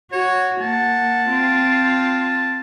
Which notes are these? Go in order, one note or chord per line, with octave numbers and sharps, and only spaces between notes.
F#4 C#5
A#3 F#5 A5
C4 F4